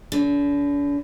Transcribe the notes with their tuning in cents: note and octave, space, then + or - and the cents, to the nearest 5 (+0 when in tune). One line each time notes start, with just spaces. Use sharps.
D3 -45